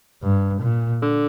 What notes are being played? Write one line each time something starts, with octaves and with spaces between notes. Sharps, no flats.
G2
A#2
D3